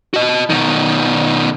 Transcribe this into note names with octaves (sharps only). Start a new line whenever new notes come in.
F#4 D#5
B2 D#3